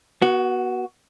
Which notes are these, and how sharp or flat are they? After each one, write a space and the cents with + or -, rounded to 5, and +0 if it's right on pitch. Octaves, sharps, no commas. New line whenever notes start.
B3 -30 F#4 +10